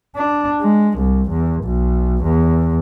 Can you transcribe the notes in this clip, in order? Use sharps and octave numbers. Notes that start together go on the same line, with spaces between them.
D4
G#3
C2
E2
B1
E2